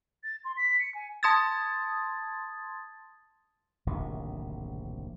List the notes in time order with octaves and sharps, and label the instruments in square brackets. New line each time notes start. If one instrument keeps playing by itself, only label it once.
[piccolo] A6
C6
B6
C#7
G#5
[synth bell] A5 C6 D#6 G#6 A6
[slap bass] D1 A#1 C3 D#3